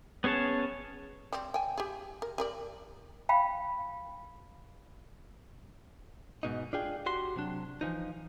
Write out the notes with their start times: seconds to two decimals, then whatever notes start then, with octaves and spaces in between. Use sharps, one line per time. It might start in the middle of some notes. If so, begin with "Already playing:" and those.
0.24 B3 C#4 G#4 C#5 A5
1.33 G3 C4
1.54 G5 G#5
1.78 G4 G#4
2.22 A#4
2.38 G4 A#4 D5
3.29 F5 G5 B5
6.43 G#2 B2 D#4
6.73 D4 F4 G#4 G5
7.06 F#4 G4 C6
7.36 C3 F#3 D4
7.81 E3 F3 D#4